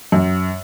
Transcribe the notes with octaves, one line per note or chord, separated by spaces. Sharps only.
F#2